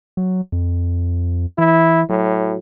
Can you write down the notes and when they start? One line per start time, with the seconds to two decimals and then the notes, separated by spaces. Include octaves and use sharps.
0.17 F#3
0.52 F2
1.58 E3 E4
2.09 A2 F#3